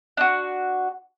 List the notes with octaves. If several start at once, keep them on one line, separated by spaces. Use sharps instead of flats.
D4 F#4